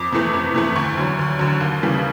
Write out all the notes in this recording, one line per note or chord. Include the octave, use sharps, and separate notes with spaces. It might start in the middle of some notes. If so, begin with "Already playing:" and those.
Already playing: F2 D6
C3 E3 A3
F2
C3 E3 A3
D2 C#6
D3 F#3
D2
D3 F#3
D#2
C#3 E3 G3